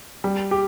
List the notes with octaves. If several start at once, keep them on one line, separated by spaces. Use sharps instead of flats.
G3
G4